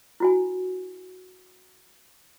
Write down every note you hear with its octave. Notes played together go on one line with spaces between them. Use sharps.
E4 F#4 G#5